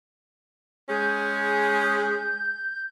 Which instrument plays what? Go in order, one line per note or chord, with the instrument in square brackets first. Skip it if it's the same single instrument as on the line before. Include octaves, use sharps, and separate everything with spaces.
[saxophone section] G#3 C#4 G#4 [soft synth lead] G6